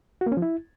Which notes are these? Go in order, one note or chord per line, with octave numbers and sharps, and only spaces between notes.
F#4
A#3
C#4
F3
E4